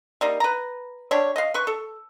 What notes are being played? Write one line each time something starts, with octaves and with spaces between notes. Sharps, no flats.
G3 A#3 D#4
B4 A#5
G3 D4 G4 C#5
D#5 F5
B4 C#6
A4